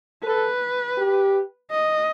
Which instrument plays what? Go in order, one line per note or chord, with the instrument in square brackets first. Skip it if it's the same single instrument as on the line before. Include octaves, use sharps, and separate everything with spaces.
[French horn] A4 [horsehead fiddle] B4
[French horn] G4
[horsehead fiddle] D#5